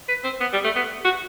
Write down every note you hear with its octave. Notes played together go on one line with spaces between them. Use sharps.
B4
C4
B3
G3
A3
B3
F#4